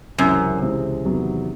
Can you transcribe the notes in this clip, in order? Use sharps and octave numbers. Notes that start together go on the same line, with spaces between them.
C#2 F#2 C3 E3 G#3 C4
C#2 C3 E3 G#3 C4
E2 C3 D#3 F#3 B3